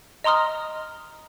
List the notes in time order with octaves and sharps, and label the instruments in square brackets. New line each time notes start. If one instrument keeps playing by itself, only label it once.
[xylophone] D#5 A#5 C6 D#6 F6